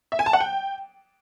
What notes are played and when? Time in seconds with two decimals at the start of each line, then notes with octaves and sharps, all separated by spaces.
0.12 E5
0.19 G#5
0.26 A5
0.33 F#5
0.40 G5